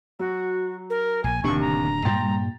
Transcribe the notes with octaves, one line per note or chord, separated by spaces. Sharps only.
F#3 F#4
A#4
A#1 G#5
D1 D#2 C3 D4 C#6
A#5
G2 A#2 G3 G5 C6 A6